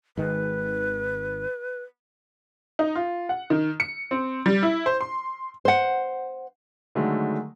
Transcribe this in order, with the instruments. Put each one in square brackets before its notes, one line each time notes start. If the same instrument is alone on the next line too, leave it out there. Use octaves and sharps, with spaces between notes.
[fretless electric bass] G#1 D#3 G#3 [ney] B4
[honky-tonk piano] D#4
F4
F#5
D#3
C#7
C4
G3
E4
C5
C6
[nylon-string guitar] C5 F#5
[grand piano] D3 D#3 F#3 G#3 A3